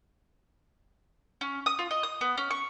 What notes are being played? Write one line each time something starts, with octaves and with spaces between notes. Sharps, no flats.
C#4
D#6
F4
D#5
D#6
B3
C#4
C#6